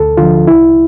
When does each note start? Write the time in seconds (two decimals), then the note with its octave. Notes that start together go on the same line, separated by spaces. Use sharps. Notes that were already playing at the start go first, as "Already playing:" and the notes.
Already playing: D2 A4
0.17 D3 F3 F4
0.47 C2 E4